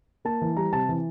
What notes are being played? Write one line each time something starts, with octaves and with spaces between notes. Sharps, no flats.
A#3 A5
E3
G3 A#5
C3 A5
E3